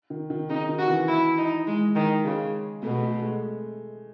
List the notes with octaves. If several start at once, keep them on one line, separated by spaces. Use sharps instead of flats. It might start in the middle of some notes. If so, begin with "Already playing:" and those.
D#3
D#3
C#3 D#4
D#3
F#4
E3
E4
D#4
G#3
D#3
C#3 G#3
B2 A3
A3
G#3